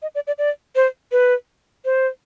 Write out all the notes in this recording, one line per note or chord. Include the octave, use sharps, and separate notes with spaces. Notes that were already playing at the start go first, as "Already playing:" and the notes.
D#5
D5
D5
D5
C5
B4
C5